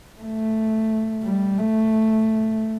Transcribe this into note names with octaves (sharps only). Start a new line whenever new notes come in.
A3
G3
A3